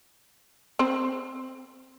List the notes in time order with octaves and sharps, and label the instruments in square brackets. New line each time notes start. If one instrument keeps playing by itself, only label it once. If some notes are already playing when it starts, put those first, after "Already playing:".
[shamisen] C4 C5